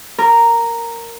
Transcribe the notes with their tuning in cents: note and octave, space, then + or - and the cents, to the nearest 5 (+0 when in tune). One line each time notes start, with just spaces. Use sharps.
A#4 -5